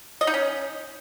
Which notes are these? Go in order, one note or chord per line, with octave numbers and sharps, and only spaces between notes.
D#5
D#4
C#4